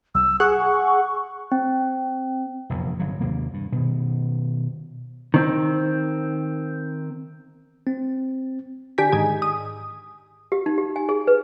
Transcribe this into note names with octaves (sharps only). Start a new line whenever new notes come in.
C2 E6
G#4 F#5 C#6
C4
F1 A#1 E2
G1 F#3
D#2 C3 A#3
G2
B2 D#3
D#3 C4
C4
D3 G4 G#5 B6
G#2 D#3 G#5
D#6
G4
D#4
G4
G#5
G#4
B4